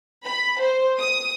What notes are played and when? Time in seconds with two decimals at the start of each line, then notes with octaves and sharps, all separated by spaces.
0.24 B5
0.60 C5
0.99 D#6